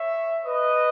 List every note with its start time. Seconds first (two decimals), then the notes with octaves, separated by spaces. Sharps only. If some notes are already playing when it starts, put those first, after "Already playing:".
Already playing: C#5 E5
0.45 B4 D#5